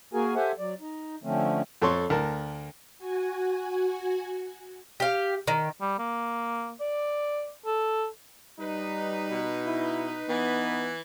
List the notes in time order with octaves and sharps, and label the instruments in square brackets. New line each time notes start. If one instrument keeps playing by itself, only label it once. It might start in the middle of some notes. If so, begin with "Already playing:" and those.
[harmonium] A#3 F#4 G#4 A#4 G#5
G4 A4 C5 E5 F#5 G#5
F#3 D5
D#4
D3 F3 A3 C4 C#4
[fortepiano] F2 A4 C#5 C6 C#6
D2 A#4 A5
[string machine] F#4 G#5
[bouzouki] G4 F5
D#3
[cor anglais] G3
A#3
D5
A4
[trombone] G3 [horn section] D#4 B4
[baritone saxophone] B2
[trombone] E4
[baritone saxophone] E3 [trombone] B3